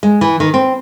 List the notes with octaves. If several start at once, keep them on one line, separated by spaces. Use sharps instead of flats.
G#3
E3
D#3
C4